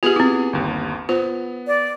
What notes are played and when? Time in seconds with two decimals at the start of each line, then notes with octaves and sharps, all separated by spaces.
0.03 B3 F4 G4 G#4 G#5
0.16 C4 E4
0.53 G1 D#2
1.09 B3 F4 C5
1.67 D5